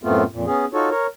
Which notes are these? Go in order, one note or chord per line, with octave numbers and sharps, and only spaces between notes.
F#2 A2 A3 B3 C4 F4
F2 A#2
B3 C#4 G#4
D#4 F4 F#4 A4 C#5
A#4 C#5